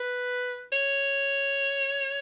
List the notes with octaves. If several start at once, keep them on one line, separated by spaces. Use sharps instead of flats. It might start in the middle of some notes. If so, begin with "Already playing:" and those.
Already playing: B4
C#5